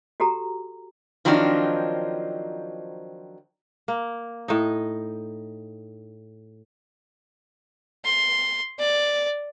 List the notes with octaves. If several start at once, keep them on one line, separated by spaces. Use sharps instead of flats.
F#4 G4 A4 A#5
D#3 F3 F#3 C4 D4 D#4
A#3
A2 D#4
C6
D5